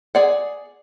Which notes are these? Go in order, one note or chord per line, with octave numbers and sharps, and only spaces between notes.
G#4 D5 F#5